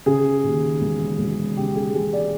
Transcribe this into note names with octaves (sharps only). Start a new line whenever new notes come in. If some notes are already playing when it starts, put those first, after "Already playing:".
C#3 G#4
D#2
E1
E1
C#3 G4
G#4
E1 G#4
D5